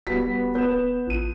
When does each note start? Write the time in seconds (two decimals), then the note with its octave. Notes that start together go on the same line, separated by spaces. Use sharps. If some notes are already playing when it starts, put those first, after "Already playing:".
0.07 D1 G3 B3 F#4 B6
0.55 B3 G6 E7
1.07 A1 F3 D#7